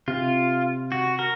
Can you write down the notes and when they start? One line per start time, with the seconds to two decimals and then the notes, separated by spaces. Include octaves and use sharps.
0.08 C3 F4
0.92 F#4
1.19 A#4